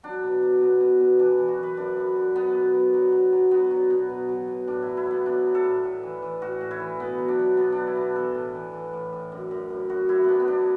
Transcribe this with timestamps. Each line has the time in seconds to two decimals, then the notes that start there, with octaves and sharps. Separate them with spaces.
0.03 F#3 D4
0.23 B2
0.42 F#3
0.61 B2
0.80 B2
1.00 B2
1.19 E3 D4
1.38 E3
1.48 F#4
1.58 F#2
1.63 B4
1.77 F#2 D4
1.97 F#2
2.16 F#2
2.35 F#3 B3
2.55 B2
2.74 F#3
2.94 F#3
3.12 F#3
3.32 F#3
3.51 F#3 B3
3.71 F#3
3.90 B2
4.09 B2
4.29 F#3
4.48 B2
4.67 A2 D4
4.82 F#3 E4
4.97 E4
5.06 F#3 B3
5.26 F#3 D4
5.45 F#3
5.55 A4
5.64 A2
5.84 A2
6.03 E3
6.22 E3
6.42 A2 F#4
6.61 A2
6.71 E4
6.80 E3
6.99 B2 B3
7.18 F#3
7.28 D4
7.39 F#3
7.57 B2 B3
7.72 F#3 D4
7.87 E4
7.96 B2 D4
8.16 E3 A4
8.35 A2
8.55 E3
8.73 E3
8.93 A2
9.13 A2
9.32 F#2
9.51 F#2
9.70 F#2
9.89 F#2 F#4
10.09 F#2 E4
10.24 F#3 B3 D4
10.40 B3
10.48 F#2 D4